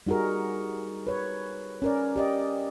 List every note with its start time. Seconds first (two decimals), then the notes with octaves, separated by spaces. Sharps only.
0.07 G3 D#4 F#4 G#4 A#4
1.07 B4 C#5
1.82 C#4 A#4 D5
2.16 G4 D5 D#5